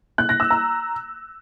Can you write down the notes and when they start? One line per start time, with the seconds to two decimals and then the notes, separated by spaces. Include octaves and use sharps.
0.18 F#6
0.29 A#6
0.40 E6
0.51 A#5